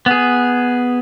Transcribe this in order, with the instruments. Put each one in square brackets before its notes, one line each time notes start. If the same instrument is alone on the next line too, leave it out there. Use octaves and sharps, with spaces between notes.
[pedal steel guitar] B3 G#4